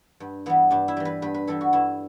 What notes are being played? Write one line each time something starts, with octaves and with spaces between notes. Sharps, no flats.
G2
E3 G3 B3
G2 D4
E4
E3 G3
B4
G2 B4
B4
E3 G3 A4
F#4
G2 E4